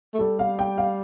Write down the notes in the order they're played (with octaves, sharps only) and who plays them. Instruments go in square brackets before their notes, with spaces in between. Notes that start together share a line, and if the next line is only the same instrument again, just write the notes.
[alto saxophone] A3
[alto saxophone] G3 [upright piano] A4
[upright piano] F5
G5
F5